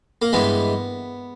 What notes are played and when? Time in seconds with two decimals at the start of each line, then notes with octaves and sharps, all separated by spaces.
0.22 A#3
0.33 G2 E3 G#3 B3